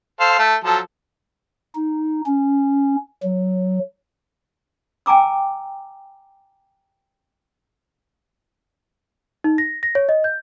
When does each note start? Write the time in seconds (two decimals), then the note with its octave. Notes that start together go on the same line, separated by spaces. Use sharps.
0.20 A4 C5 F5
0.39 A3 A4
0.64 F3 F#3 A4
1.75 D#4
2.26 C#4
3.23 F#3
5.06 G5 G#5 A#5 D6 E6
9.44 D#4
9.58 A#6
9.83 A#6
9.95 C#5
10.09 D#5
10.24 G6